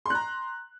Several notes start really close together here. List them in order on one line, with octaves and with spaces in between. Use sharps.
C6 F#6 A#5